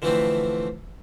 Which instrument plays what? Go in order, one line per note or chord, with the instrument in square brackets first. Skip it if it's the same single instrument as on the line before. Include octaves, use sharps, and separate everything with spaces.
[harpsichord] D3 E3 F3 A3 B3 C4